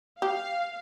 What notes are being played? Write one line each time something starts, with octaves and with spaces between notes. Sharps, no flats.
G4 F5